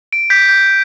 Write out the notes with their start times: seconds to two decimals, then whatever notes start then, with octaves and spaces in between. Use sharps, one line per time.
0.13 D7
0.30 G6 B6
0.49 G6